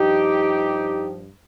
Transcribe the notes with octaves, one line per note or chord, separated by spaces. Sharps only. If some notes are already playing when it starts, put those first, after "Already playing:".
Already playing: G2 F3 D#4 G4